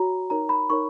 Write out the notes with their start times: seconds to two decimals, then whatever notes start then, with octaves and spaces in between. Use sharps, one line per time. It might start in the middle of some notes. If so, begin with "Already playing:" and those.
Already playing: F#4 C#5 A#5
0.30 D#4 A#4 C#5 A#5
0.49 B5
0.70 D#4 A#4 C#5 C#6